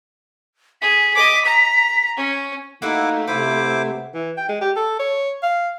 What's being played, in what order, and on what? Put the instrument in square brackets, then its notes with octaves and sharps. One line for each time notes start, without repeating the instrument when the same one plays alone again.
[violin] G#4 [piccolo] B6
[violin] D#5 D6
A#5
C#4
[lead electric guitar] A3 [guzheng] A#3 F#4 [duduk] D#4 [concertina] E4 F#5 D6
[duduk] C3 [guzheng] B3 B4 [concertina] E4 C5 D6
[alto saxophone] E3
G5
G#3
G4
A4
C#5
F5